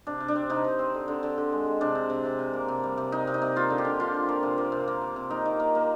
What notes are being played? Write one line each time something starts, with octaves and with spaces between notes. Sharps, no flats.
C3 D4
C3
D4
C4
C3 D#4
C3
C4
D3
D3
D3
D3
G#3
G#3
C3 D4
C3
C3
C3
C3
A#3
C3
G3
C3
C3 D#4
C3
D#4
C3
A#3 F4
D3
G4
D3
D3 F4
F3
A#3
C3
A#3
C3
A#3
C3
C3
A#3 D#4
D#3
A#3
A#3